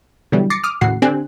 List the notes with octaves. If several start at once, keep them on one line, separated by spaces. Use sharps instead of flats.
B2 D3 E3 F#3 G3
D6 A6 A#6 C7 C#7
D6 D#6 F6
D#2 A2 C#3 F#4 F#5 C7
D3 C4 D4 G4 G#5 F#6